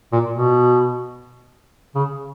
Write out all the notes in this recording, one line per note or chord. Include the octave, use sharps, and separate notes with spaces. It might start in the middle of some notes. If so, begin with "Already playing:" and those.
A#2
B2
C#3